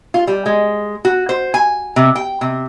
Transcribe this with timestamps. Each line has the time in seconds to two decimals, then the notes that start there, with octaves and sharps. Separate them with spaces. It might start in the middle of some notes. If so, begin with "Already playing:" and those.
0.14 F4
0.27 G3
0.46 G#3
1.05 F#4
1.29 C5
1.54 G#5
1.96 C3
2.16 G5
2.41 C3